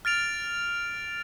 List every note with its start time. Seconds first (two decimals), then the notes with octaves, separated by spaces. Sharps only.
0.05 F6 A6 D7 F7